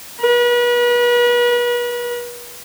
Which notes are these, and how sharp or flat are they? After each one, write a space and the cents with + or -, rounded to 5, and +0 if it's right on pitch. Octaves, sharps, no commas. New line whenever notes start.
B4 -35